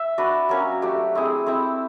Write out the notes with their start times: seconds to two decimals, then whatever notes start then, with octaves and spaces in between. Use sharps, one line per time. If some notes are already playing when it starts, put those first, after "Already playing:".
Already playing: E5
0.18 D4 F#4 B4
0.49 F#3 A#3 C#4
0.82 F#3 A3 D4 G4
1.15 A3 C4 E4 G#4
1.46 A3 C4 E4